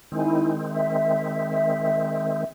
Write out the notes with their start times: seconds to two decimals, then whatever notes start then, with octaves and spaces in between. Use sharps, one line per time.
0.12 D#3 G#3 C4 D#4 E4 G#5
0.69 E5